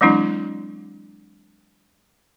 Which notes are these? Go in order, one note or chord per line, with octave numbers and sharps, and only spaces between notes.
E3 F#3 G#3 C4 D4 E4